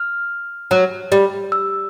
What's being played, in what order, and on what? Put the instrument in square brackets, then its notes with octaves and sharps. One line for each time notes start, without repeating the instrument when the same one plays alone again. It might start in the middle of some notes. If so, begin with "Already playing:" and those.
Already playing: [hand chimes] F6
[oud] F#3
G3
[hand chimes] E6